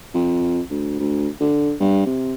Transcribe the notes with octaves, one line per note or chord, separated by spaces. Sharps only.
F2
D2
D2
D3
G2
C3